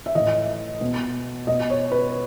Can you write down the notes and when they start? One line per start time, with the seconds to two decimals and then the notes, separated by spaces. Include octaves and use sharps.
0.06 E5
0.15 A2 E3 D#5
0.81 B2
1.47 B2 D#5
1.70 C#5
1.92 B4